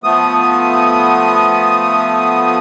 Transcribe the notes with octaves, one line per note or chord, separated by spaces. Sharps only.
F3 A3 B3 D#6